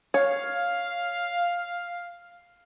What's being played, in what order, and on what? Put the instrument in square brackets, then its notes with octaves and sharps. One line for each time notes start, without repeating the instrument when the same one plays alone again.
[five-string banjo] C#5 [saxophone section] F5